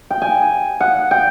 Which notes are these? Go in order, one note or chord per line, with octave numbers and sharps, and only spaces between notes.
G5
G#5
F#5
G5